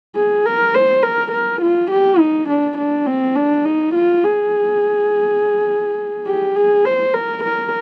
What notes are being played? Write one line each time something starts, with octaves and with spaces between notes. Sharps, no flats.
G#4
A#4
C5
A#4
A#4
F4
G4
D#4
D4
D4
C4
D4
D#4
F4
G#4
G4
G#4
C5
A#4
A#4